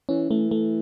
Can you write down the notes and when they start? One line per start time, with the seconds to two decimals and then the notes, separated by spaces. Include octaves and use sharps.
0.09 E3 C#4
0.30 E3 A3
0.51 A3